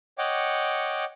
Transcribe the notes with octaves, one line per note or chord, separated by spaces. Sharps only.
C#5 D#5 F#5 G5 D6